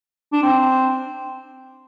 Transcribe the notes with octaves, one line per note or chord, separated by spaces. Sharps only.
D4
C4